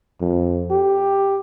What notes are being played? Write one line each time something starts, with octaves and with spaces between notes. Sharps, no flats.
F2
G4